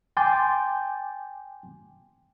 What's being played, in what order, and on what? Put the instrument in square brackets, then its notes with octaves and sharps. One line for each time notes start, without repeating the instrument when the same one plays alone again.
[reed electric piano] G5 G#5 C6 D6 G6 A6